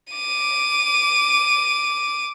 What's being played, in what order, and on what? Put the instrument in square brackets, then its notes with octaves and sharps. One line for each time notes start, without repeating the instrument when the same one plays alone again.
[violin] D6 D#7